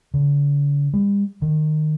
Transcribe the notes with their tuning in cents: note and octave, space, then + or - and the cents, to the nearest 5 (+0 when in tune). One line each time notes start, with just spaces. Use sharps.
D3 -45
G3 +40
D#3 -20